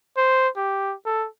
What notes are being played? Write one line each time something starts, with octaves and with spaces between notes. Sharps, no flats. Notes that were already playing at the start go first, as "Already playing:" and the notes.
C5
G4
A4